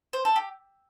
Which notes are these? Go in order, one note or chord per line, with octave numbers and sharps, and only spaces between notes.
C5
A4
G4